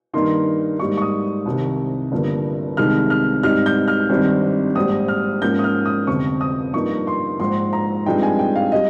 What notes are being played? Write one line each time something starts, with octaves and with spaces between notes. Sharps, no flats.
G2 D#3 A#3 D#4 C6
G#2 G3 A#3 D#4 C#6
C#6
D#6
C2 C3 D#3
G1 G2 F3 A#3
C2 C3 D#3 G#3 D#4 F6
F6
G#2 G3 C4 D#4 F6
G6
F6
G#1 G2 G3 C4 D#4
A#1 G#2 G3 D#6
F6
G#2 F3 A#3 C#4 G6
D#6
F6
D#6
G1 F2 C3 C#6
D#6
G2 F3 A#3 D#4 C#6
C6
A#1 G#2 F3 C6
A#5
G2 F3 G#3 C4 D#4 G5
G#5
G5
F5
G3 D#5